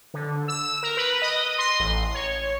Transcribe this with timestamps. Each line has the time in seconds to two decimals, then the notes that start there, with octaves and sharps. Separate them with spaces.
0.14 D3
0.48 E6
0.83 A#4
0.97 B4
1.22 D#5
1.58 C6
1.80 A1
2.14 C#5